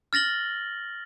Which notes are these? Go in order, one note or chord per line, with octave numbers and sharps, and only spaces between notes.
F6 A6 A#6 F#7 G7